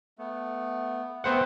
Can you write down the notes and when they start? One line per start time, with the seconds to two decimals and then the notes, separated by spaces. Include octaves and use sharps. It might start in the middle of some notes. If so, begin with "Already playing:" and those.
0.19 A3 B3
1.24 A3 B3 C4 C5 F#5